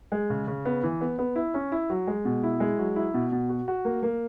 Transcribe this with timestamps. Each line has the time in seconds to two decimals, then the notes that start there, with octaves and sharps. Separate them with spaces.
0.12 G#3
0.30 C#3
0.47 C#3
0.65 B3
0.83 E3
1.01 B3
1.19 B3
1.36 E4
1.54 C#4
1.72 E4
1.90 F#3
2.07 G#3
2.25 B2
2.43 E4
2.60 G#3
2.79 F#3
2.96 E4
3.14 B2
3.32 B2
3.49 F#4
3.68 F#4
3.85 A#3
4.03 A#3